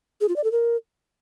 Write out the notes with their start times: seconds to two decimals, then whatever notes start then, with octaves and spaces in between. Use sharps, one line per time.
0.21 G#4
0.29 F4
0.36 D5
0.44 A4
0.52 A#4